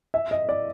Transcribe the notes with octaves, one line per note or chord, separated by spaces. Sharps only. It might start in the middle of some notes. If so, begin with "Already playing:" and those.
E5
D#5
D5